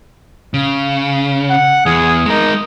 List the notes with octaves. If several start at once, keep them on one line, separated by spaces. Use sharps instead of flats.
C#3
F#5
E2 G#4
G#3 D#4 A#4